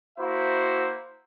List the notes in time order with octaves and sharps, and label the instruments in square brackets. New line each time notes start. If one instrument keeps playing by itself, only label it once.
[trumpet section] A#3 E4 F#4 C5 E5